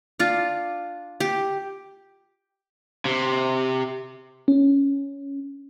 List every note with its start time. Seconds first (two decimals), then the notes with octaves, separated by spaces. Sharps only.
0.19 D4 F4
1.20 G4
3.05 C3
4.48 C#4